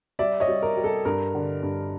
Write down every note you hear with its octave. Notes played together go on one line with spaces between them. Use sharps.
G3 D5 E5
C#5 D#5
G3
A#4
G3
A4
G2 A#4
D3
G2